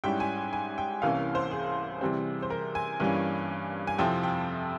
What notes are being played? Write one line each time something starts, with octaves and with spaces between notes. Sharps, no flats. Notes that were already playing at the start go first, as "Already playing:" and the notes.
G#2 G3 C#4 E4 G5
G#5
G#5
G5
C2 C3 E3 A#3 C#4 F5
C5
G#4
C3 E3 G3 C4
C5
A#4
G#5
G2 E3 G3 A#3 C#4 G#5
G#5
F2 C3 F3 C4 E4 G5
G5